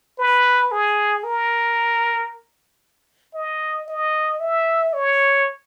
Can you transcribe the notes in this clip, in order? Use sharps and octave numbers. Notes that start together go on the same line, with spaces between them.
B4
G#4
A#4
D#5
D#5
E5
C#5